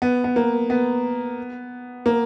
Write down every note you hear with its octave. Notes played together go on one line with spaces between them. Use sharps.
B3
B3
A#3
B3
A#3